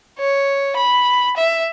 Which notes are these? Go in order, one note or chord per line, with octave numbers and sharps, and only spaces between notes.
C#5
B5
E5